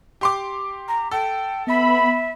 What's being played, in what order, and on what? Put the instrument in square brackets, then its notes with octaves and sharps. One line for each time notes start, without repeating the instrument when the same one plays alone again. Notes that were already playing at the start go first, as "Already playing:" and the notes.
[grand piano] G4 C6 D6
[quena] A#5
[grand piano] A4 [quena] G5
[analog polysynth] B3 B5 [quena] E5